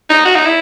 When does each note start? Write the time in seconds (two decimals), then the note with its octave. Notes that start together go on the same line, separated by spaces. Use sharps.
0.09 D#4
0.25 F#4
0.35 D#4
0.45 E4